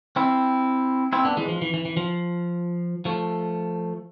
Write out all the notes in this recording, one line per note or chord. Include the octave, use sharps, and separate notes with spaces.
C4 E4
C4 E4
B3 D4
E3 G#3
F3
E3
E3
E3
F3
F3 A3